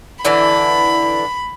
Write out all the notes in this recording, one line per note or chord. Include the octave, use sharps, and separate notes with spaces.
D3 E3 D4 B5